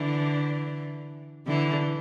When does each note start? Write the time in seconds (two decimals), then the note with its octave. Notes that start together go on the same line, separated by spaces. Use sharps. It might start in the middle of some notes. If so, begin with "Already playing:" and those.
Already playing: D3 E3
1.47 D3 E3